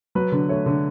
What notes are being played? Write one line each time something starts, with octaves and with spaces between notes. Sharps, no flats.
F#3 B4
D3
A3 C#5
D3